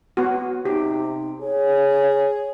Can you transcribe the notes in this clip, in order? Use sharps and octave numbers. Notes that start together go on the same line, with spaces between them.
B3 F#4
C3 D#4 G4
G#4 C#5